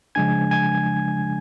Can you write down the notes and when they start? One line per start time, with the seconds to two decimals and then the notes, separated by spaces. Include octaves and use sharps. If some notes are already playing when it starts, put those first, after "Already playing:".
0.15 C#3 F3 G#3 D4 G#5 G#6
0.51 G#5 G#6